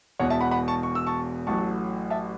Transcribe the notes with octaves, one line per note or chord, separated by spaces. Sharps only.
E1 E2 B2 C#5 F#5
E5 A5
F#5 B5
F#5 B5
A5 C#6
C#6
E6
A5 C#6
A1 A2 F#3 A5 C#6
E5 A5